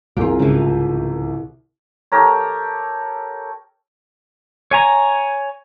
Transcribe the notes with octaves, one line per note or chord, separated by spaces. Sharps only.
C2 C3 F4 G4 G#4 A#4
C#2 G#2 C#3 E3 F3
G4 A4 A#4 C#5
C#5 G#5 A#5